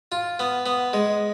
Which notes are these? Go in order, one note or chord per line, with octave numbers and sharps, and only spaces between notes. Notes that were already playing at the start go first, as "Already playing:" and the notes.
F4
B3
B3
G#3